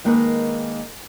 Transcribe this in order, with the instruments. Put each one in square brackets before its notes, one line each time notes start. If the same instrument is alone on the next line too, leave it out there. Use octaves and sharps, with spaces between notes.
[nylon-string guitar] D#3 G#3 A#3 D#4 G#4 B4